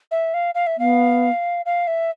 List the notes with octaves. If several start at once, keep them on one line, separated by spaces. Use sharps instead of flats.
E5
F5
F5
E5
B3 F5
F5
E5